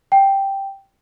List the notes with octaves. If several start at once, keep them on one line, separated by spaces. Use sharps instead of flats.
G5